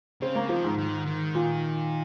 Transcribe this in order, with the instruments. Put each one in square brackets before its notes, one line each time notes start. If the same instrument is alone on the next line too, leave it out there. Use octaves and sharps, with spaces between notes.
[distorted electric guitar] C#3 [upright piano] C4
[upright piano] A#3
[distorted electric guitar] D#3 [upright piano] F3
[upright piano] G#2
[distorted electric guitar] D#3
D#3
[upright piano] A#2